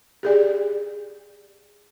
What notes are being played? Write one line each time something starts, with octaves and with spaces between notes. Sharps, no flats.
G4 G#4 D5